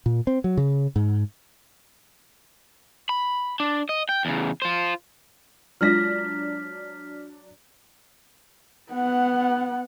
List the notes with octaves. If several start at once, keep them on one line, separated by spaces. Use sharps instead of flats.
A#2
C4
F#3
C#3
G#2
B5
D4
D#5
G5
E2 C#3
F4 C5
F#3 G#3 D4 F4 F6 A#6 B6
B3 F#5